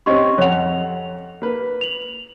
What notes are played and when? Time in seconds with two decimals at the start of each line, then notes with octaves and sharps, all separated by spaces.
0.06 C4 C#4 G4 D#5 C6 C#6
0.38 F2 C#5 F#5 F7
1.42 A#3 B4
1.81 F7 F#7